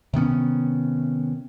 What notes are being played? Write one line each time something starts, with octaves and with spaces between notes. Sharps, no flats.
C3 D#3 B3 C#4